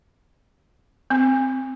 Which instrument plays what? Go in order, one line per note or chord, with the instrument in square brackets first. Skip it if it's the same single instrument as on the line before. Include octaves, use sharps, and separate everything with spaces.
[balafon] C4